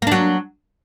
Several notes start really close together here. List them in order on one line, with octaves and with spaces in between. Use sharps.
A#3 D4 F#3